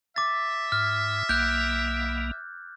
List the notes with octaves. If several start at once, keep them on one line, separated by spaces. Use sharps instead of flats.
E5 D6 A6
G#2 F6
B1 A#3 F#6 G6